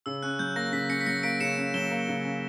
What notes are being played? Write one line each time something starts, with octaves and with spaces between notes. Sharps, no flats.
C#3 E6
C#4 F#6
F#3 G6
A#3 A#6
C#3 B6
C#4 A#6 C#7
B6
F#3 A#6 C#7
A#3 B6 D7
C#3 C#7 E7
C#4
F#3 E7 G7
A#3
C#3
C#4